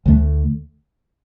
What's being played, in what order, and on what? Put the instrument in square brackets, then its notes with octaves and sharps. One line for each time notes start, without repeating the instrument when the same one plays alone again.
[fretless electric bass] D2 D3 A3